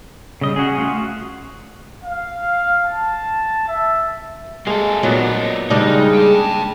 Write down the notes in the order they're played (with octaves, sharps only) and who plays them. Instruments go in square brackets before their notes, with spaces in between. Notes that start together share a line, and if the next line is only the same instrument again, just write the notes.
[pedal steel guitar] C#3 D#5 [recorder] G3
[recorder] C#4 [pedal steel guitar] F#4 G#4
[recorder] A3 [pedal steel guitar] F4 F#4
[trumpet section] F5
A5
E5
[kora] G#3 [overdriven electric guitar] A#3 A4
[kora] A#2 F#3 [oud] B3 [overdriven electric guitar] D#4 D5
[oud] C#3 G3 G#3 [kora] D4 D#5 [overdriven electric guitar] D#4
[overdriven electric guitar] G5 A5